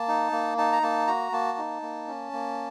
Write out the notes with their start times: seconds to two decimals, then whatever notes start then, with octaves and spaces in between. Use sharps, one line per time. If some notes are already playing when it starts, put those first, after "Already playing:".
Already playing: A#3 A5
0.08 D#4
0.32 A#3
0.58 D#4 A5
0.73 A#5
0.82 A#3 A5
1.07 F#4 A#5
1.32 A#3 A5
1.58 D#4
1.82 A#3
2.07 C#4
2.33 A#3